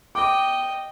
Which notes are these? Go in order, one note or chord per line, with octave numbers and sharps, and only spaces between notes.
D#5 G5 D6